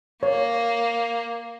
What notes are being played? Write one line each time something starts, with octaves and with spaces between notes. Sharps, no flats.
A#3 C#5